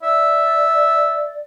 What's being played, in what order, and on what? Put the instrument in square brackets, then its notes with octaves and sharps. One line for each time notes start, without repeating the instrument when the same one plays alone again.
[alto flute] D5 [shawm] E5